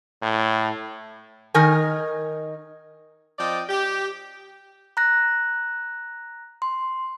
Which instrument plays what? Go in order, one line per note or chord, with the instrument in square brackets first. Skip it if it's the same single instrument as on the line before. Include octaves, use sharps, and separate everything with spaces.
[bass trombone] A2
[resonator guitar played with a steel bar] D#3 D#4 A#4 G#5
[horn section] F3 C4 D5 D#5 G5
G4
[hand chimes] A#5 F#6 A#6
C6